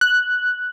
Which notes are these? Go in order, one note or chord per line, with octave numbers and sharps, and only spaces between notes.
F#6